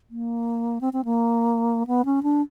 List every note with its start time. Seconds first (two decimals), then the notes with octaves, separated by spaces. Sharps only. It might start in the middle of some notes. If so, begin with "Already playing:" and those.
0.10 A#3
0.81 C4
0.93 C4
1.05 A#3
1.87 B3
2.05 C#4
2.23 D4